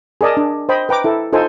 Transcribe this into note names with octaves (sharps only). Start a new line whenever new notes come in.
G#4 A#4 D5 D#5 A5
D4
C5 D#5 G5 B5
B4 G5 A#5 D6
E4 A4
D#4 F4 A4 C5 G#5